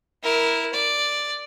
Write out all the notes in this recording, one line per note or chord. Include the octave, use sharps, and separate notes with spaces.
E4 A#4
D5